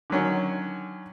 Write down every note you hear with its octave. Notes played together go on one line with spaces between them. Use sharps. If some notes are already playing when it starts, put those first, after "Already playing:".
D3 D#3 F#3 C#4